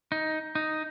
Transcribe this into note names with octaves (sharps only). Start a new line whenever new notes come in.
D#4
D#4